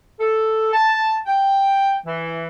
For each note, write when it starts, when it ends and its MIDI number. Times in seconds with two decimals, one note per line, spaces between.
0.19 0.70 69
0.73 1.18 81
1.26 1.96 79
2.06 2.47 52